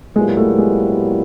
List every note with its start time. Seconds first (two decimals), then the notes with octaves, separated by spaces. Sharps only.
0.16 A#2 F#3 G#3 B3 E4 G4
0.37 A3
0.58 G#3